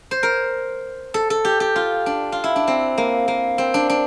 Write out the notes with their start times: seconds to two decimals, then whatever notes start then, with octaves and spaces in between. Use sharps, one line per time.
0.11 C5
0.23 A#4
1.14 A4
1.30 A4
1.45 G4
1.60 G4
1.76 F4
2.06 D4
2.32 F4
2.44 E4
2.56 D4
2.67 C4
2.98 A#3
3.28 A#3
3.58 C4
3.74 D4
3.90 D4